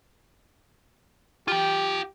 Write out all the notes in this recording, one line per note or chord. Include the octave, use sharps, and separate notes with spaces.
F4 G4 G5